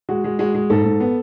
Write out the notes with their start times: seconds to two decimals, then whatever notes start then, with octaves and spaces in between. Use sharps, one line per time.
0.09 G#3 F#4
0.24 G#3
0.39 G#3 F#4
0.55 G#3
0.70 G#2 A4
0.85 G#2
1.00 B3